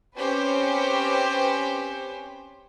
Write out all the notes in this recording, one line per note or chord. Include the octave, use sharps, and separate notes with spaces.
C4 C#4 G4 B4 C5